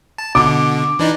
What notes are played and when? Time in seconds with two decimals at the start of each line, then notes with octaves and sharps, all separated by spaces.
0.18 A5
0.35 B2 D3 D6
0.99 E3 D4 D#4